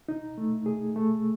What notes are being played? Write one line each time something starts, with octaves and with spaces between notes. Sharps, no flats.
D#4
A3
G#4
A3